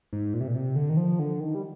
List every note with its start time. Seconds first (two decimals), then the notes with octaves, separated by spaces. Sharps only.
0.13 G#2
0.34 A#2
0.41 C3
0.48 A#2
0.55 C3
0.76 D3
0.89 D#3
0.97 F3
1.19 D3
1.40 D#3
1.55 G3